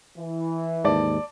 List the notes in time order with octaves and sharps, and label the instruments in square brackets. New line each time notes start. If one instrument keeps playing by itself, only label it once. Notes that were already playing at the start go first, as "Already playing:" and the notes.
[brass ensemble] E3
[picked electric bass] D#2 G#2 [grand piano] D5 A5